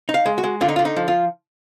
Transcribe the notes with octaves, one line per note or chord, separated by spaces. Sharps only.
D#4
F5
G#3
F#4
G#3
D3 F4
D#4
F4
D3
D#4
F3
F4